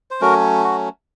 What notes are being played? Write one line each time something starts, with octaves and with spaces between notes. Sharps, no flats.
C5
F#3 A3 C#4 F#4 A#4
F#4